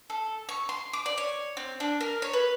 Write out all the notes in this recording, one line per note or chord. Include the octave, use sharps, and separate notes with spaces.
A4
C#6
C6
D6
D5
C#5
C4
D4
A#4
C#5
B4